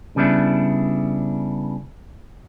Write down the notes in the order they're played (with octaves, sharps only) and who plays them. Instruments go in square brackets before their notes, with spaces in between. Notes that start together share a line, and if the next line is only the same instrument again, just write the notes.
[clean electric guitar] C#3 G3 B3 D4 E4